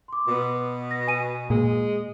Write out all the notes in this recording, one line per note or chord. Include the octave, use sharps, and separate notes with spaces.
C6 D6
B2 B3
A#6
G#5 D#7
A#2 G#3